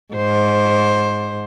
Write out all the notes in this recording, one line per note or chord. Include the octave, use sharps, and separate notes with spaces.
G#2 C5